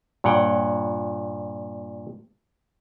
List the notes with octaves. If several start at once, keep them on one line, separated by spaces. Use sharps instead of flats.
G2 A#2 C#5 F#5 G5